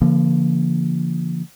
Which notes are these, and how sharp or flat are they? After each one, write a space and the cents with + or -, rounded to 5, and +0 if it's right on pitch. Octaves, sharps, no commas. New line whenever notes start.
D3 -40 F3 -40 A#3 +0